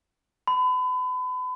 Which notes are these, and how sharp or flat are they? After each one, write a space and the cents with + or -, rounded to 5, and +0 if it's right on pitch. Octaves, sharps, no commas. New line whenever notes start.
B5 +35